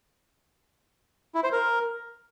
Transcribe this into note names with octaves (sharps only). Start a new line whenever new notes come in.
E4
C5
A#4